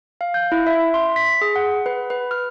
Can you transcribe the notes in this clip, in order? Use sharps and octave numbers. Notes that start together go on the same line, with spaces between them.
F5
G6
E4
E5
C6
B6
G#4
F#5
B4
B4
F6